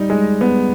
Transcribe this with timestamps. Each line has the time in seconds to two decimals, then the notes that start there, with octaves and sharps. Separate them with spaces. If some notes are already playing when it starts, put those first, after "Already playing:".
Already playing: G3 D#4
0.10 G#3
0.41 B3